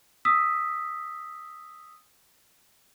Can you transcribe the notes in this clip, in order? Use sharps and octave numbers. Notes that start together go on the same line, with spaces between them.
D#6 E6 B6